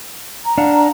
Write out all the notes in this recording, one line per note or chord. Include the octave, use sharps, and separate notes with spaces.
A#5
D4 F5 F#5